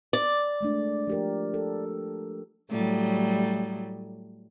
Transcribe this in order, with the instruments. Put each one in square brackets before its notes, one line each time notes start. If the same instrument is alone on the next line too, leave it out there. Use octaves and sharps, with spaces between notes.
[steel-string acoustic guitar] D5
[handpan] G#3 A3 D4
F3 G4 A#4
A4
[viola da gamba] A2 F#3 G3